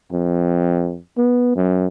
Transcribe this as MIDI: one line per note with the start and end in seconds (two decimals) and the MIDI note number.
0.12 0.97 41
1.18 1.52 59
1.56 1.86 42